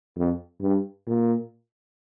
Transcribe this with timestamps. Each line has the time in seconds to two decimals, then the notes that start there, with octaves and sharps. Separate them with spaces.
0.17 F2
0.61 G2
1.07 A#2